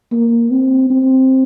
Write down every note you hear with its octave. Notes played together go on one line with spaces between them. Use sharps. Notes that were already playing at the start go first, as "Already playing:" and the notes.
A#3
C4
C4